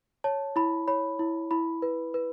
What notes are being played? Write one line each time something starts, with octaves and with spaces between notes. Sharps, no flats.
C#5 A5
E4 B5
C#5 B5
E4
E4 B5
B4
B4